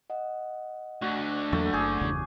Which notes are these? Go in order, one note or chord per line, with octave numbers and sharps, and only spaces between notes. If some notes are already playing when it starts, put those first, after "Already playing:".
D#5 F#5
D2 D3 F#4
E2 F#3 A3 A#3
F#1 G#4 D6 G6
G1 E2 C#3